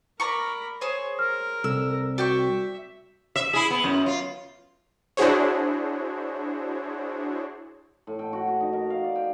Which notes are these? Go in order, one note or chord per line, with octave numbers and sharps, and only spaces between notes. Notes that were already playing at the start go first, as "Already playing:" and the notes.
A#4 D5 A#5 B5 C#6
G#4 C5 C#5 D#6
A#4 F6
C2 A4 E6
F#4 D5 E5 G5 C#6
E5
E4 G#4
B3
F#2
F4
D4 E4 F#4 G#4 C5 C#5
A2
G5
F#4
F#4
D#4
A#4
F5
D5
G5